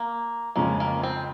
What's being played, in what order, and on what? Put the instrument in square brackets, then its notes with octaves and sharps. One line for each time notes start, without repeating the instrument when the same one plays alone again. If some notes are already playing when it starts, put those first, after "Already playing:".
Already playing: [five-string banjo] A#3
[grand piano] F2 C#3 G#3 C#4 [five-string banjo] A#3
[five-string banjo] A#3
C4